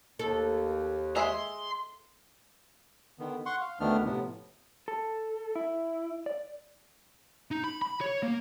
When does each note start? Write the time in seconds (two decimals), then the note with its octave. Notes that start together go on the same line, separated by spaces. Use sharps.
0.19 D#2 A4
1.16 G#3 G#4 E5 A#5 C6
3.19 D3 D#3 B3
3.46 F#5 C6 C#6
3.61 F5
3.80 D2 D#3 A3 B3 D4 F6
4.05 A2 C3 F3 B3
4.88 A4
5.55 E4
6.26 D5
7.51 D#4
7.64 B5
7.82 B5
8.01 C#5
8.23 A#3